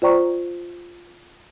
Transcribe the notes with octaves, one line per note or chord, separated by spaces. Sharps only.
F4 C5 D5 G5 A#5 C#6